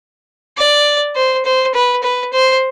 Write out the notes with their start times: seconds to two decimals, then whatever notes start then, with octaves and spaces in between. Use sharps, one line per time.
0.58 D5
1.16 C5
1.45 C5
1.74 B4
2.03 B4
2.33 C5